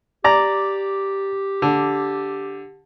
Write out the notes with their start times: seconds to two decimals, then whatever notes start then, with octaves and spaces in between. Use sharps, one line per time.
0.24 G4 D5 A#5
1.62 D3